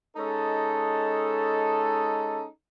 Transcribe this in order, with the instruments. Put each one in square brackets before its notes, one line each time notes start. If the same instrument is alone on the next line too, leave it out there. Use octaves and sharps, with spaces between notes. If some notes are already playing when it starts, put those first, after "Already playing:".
[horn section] G#3 C#4 D#4 A4